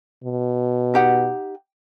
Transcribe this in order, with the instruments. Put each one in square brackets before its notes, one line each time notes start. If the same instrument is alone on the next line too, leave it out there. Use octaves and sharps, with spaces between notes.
[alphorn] B2
[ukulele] D#4 G4 F#5